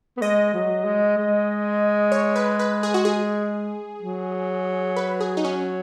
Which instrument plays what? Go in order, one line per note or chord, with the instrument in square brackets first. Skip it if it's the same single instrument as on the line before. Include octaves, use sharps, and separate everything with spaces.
[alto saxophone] B3
[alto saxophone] G#3 [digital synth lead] D#5
[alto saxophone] F#3
G#3
G#3
[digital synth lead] C#5
B4
B4
G#4
F#4
G#4
[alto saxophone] F#3
[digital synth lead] B4
G#4
D#4
C#4